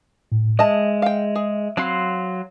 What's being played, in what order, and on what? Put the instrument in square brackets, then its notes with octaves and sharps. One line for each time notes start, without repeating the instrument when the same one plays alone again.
[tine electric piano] A2
[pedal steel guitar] G#3 [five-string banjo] D#5 A5 [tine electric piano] E5
[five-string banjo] F5 G5
G#4
[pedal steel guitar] F#3 F5 C6 [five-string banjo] C4 B5